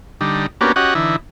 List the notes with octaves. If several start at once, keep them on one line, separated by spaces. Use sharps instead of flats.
D3 G3 D#4
A#3 B3 C#4 D4 F#4 G4
C#4 F#4 G4 D#5 F#5
D3 E3 D#4 E4